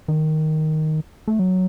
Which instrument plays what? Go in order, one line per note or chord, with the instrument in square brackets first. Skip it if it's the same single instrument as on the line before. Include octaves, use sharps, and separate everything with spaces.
[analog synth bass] D#3
A3
F#3